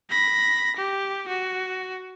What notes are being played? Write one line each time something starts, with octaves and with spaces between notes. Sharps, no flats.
B5 A#6
G4
F#4